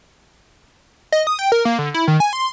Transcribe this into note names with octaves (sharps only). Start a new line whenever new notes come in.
D#5
D#6
G5
A#4
A#3
D3
E4
D#3
G#5
C6